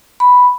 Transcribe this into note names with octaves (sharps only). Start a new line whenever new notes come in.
B5